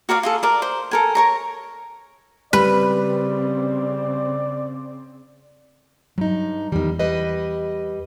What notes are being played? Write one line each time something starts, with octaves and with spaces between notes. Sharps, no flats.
F#4 A#4 D5 F5
F4 G#4 A4
A#4 D5
C5
A4 A#4 G#5
A#4 C#5 A#5
C#3 G3 C4 B4 D5
G2 F#3 D#4
E2 D#3 E3 G3
G3 B4 D#5